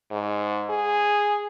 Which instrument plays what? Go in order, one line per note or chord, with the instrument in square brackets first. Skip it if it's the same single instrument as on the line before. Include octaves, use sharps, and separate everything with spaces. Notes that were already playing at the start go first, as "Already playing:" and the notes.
[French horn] G#2
G#4